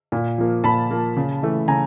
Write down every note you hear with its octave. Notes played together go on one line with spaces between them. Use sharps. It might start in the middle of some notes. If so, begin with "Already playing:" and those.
A#2
F3 A#3
A#2 A5 B5
F3 A#3
C#3
E3 A3
C#3 G#5 A#5